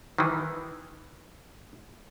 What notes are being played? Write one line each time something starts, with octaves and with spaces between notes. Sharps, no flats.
D#3 E3